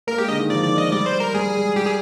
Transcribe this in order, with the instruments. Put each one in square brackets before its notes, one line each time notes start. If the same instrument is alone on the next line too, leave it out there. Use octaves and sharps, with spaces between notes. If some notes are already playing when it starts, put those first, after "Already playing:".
[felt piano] A#3 [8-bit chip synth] A#4
[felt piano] G#3 [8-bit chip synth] G4
[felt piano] D3 [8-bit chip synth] D#5
[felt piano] D#3
[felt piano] F3 [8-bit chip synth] D5
[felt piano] D#3 [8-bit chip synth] D5
[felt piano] F3 [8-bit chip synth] D#5
[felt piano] G3 [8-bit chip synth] D5
[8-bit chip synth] C5
A#4
[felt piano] G3 [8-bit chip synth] G#4
[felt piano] G#3
[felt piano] G3 [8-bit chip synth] G4
[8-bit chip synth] G#4